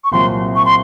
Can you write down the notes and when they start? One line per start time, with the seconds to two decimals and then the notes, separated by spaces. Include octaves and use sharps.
0.04 C#6
0.12 C2 A#2 F#3 C4 C6
0.56 C#6
0.65 C6